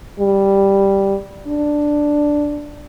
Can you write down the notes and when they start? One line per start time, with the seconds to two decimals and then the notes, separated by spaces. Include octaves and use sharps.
0.20 G3
1.47 D4